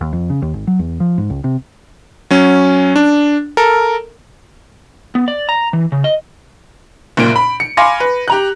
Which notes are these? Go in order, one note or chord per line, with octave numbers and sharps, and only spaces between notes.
D#2
F2
C#3
D#2
G#1
F#3
E2
F3
G#2
C#2
C3
F#3 C#4
D4
A4 A#4
B3
D5
A#5
E3
C#3
D#5
F#1 A#2 D7
B5
C#7
F5 G#5 B5 C6 D6 A#6
B4
G4 A#5 F#6